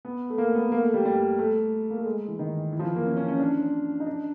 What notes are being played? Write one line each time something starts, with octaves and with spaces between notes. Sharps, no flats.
B3
A3
A#3
B3
A#3
A3
G3
G3
A3
A#3
A3
G#3
E3
D#3
E3
F3
E3
A#3
C#4
C#4
C#4
D4
D#4
D4